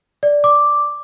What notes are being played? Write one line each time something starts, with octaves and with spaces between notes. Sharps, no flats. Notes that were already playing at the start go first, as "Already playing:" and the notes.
D5
D6